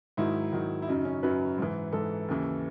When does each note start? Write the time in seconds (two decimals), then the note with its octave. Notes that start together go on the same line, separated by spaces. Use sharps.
0.17 G#2 D#3 F#3 E4
0.52 G#2 D#3 F#3
0.82 E4
0.88 F#2 C#3 F#3 D#4
1.05 C#4
1.23 F#2 C#3 F#3 B4
1.58 G#2 E3
1.93 G#2 E3 A4
2.28 D#2 C#3 E3